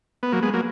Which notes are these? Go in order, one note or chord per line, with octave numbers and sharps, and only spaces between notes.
B3
F#3 A#3
G#3 B3
F#3 A#3